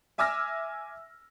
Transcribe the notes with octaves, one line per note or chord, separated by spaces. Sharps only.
E5 G#5 D6 E6 F6 A#6